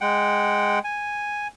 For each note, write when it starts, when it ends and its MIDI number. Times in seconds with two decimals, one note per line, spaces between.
0.01 0.79 56
0.01 0.79 78
0.01 0.79 79
0.84 1.48 80